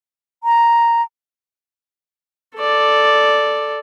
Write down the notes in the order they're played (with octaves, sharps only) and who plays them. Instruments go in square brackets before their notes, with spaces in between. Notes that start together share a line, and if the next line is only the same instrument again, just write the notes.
[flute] A#5
[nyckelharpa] A4 D5